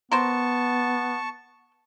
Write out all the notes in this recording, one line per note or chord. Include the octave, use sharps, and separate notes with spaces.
B3 A#4 C5 A5 C#6